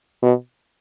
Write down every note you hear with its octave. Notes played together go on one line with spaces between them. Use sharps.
B2